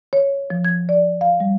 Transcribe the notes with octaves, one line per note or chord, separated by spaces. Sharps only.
C#5
F3
G#6
D5
F5
G3